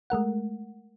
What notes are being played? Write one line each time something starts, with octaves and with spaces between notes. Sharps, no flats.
G#3 A3 A#4 F#5